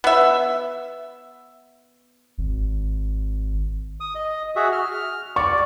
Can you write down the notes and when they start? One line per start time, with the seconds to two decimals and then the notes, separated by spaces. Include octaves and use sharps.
0.04 B3 E5
2.38 G#1
4.00 D#6
4.15 D#5
4.56 F#4 G#4 E5
4.72 F6
5.36 D5 C#6